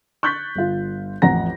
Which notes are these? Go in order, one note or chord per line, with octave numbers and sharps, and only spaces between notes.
C#6 F#6 G6 A6 B6
G1 F4
A1 F2 F#5 A#5 A#6